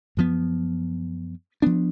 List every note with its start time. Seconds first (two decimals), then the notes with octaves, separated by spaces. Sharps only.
0.17 F#2 F3 B3
1.62 F3 B3 D4